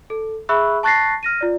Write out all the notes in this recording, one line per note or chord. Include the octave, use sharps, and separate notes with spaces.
A4
G#4 E5 B5 C#6 E6 F#6
A5 C#6 F#6 A6 A#6 C7
F6 A#6 D#7
F4 D5